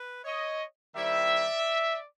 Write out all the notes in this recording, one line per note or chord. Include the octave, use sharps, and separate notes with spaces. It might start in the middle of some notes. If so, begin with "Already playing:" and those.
Already playing: B4
C#5 D#5
D#3 G3 C4 E4 D5 E5